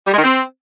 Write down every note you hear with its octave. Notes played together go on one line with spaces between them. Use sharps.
G3
G#3
D#3
C4